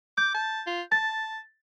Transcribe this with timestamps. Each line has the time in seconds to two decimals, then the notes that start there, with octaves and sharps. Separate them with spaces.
0.18 D6 G6
0.35 A5
0.67 F4
0.92 A5 A6